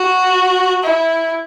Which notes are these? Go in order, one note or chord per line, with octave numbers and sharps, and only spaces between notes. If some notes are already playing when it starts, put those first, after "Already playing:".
Already playing: F#4
E4